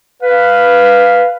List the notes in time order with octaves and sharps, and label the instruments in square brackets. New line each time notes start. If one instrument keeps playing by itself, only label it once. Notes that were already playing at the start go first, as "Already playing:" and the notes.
[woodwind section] B4 [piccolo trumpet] F5